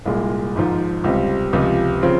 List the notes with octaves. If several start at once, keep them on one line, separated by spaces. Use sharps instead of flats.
C2 A#2 G#3
G#1 G#2 F3
C#2 C3 G3 C4
C#2 C3 F3
C#3 F3 C4 F4